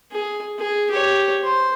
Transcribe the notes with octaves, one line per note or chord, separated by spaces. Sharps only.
G#4
G#4
G4 C#5
C5